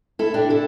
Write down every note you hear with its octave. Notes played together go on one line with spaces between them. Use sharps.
E4 A4
D4 G4
E4 A4